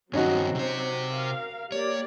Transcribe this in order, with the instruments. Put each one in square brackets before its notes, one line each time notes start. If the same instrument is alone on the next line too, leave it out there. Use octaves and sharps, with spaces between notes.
[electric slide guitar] G2 D#3 [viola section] F#3 C4 [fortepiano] C#4 D#4 F#4
[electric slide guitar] C3 C5
[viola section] A#4 F5
[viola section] A#3 G4 D5 [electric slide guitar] C#5